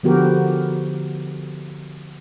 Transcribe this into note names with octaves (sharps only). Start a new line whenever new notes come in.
D3 F3 B3 F#4 G4 A#4